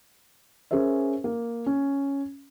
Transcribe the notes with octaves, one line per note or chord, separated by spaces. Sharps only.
C#4 G#4 A#4 C5 E5
A#3
C#4